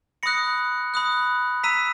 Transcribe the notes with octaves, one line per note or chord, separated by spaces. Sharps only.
B5 D#6 F#6 A#6 C#7
B5 D#6 F#6
A#5 E6 B6 D#7